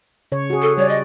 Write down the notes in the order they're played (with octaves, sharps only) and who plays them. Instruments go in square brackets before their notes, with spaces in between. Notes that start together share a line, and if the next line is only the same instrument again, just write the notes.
[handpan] C#3 C#5
F#4 G#4
[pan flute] A4
[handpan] G3 D5 [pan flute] C#5
[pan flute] D#5